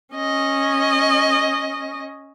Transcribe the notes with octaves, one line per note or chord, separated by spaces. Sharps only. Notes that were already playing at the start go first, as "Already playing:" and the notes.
C#4 D#5